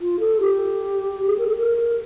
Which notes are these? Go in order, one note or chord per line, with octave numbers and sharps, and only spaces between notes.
F4
A4
G4
G#4
A#4
A4
A#4